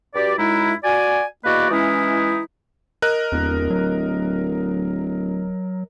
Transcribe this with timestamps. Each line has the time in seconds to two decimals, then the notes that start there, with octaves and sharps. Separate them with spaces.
0.15 G2 F#4 G4 D5
0.37 F#2 G#3 D#4 E4
0.83 F#4 D5 G#5
1.45 E2 A#3 F#4 B4 D5 D#5
1.70 E3 G#3 C#4 D#4 E4
3.02 A#4 D#5 F#6
3.32 D1 E2
3.70 F#3